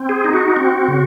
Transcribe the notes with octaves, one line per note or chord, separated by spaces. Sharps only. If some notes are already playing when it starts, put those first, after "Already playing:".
Already playing: C4
G#4
D#4
F#4
C4
C#3